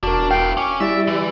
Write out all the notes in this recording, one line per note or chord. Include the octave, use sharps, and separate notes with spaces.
E1 D4 F#4 A#4
B3 F5 G5
C#4 D6
G3 E4 D5 E5 D7
E3